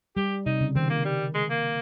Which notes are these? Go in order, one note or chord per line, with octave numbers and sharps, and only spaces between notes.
G3 G4
C3 D#4
C#3
D#3 C4
A#3
G3
G#3
A#3